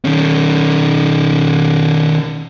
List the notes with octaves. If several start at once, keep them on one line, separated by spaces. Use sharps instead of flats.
D#3 C#4